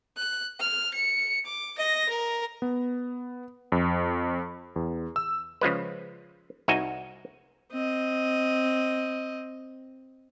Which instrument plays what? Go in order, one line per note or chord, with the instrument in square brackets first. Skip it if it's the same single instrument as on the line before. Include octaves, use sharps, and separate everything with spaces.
[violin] F#6
F6
C#7
D6
D#5 A#6
A#4
[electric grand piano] B3
F2
E2
E6
[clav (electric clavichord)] C#3 F3 G#3 B4
C2 D#4 F#4 E5 G#5
[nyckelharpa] C4 D#5